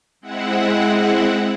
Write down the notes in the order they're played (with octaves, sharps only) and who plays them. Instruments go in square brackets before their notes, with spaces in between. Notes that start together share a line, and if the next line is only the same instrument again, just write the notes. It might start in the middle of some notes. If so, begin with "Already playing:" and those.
[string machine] G#3 C4 E4 F#5